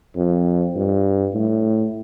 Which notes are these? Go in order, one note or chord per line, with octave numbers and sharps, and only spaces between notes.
F2
G2
A2